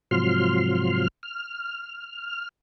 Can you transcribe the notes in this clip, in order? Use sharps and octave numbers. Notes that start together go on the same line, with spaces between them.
G#2 C3 F3 F#3 C6 F6
F6